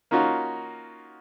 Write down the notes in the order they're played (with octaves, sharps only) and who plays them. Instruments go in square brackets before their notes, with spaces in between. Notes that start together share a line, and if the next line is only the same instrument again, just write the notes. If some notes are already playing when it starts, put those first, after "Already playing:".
[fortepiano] A#3 C#4 D#4 F4 F#4